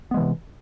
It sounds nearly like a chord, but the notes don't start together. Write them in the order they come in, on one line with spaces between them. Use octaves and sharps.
B3 G#3 E3 C3